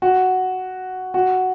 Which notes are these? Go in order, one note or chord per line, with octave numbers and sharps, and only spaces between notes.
F#4
F#4